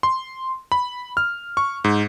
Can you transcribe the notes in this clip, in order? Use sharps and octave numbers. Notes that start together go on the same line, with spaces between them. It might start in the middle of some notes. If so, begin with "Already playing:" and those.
C6
B5
F6
C#6
G#2